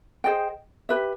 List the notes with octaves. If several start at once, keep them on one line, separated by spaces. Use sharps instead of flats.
G#4 C5 D#5 G5
G4 B4 E5